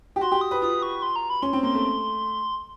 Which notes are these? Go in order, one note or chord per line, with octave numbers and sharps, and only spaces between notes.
G4
F#4 C6
G4
D#6
B4
F4 D#6
C#6
C6
A#5
B5
C#4 C6
C4
A#3 C6
A3